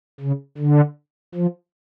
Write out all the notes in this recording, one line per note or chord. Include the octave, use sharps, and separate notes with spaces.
C#3
D3
F3